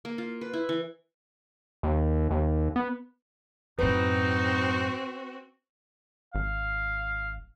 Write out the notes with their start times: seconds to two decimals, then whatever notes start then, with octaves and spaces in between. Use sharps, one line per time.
0.05 A#3
0.18 F4
0.41 B4
0.53 E4
0.69 E3
1.83 D#2
2.31 D#2
2.76 B3
3.79 F#2 A2 C4 D#4 F#4 B4
6.35 G#1 F5